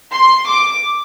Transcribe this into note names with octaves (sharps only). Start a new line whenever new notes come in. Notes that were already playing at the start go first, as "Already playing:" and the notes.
C6
D6